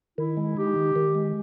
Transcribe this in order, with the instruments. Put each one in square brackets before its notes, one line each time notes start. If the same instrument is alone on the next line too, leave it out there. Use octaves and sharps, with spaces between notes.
[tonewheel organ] D#3 [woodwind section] E4
[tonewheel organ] G#3
[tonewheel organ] D#4 [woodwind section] G4
[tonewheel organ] D#3
D#3
G#3